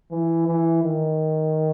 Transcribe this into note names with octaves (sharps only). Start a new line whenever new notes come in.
E3
E3
D#3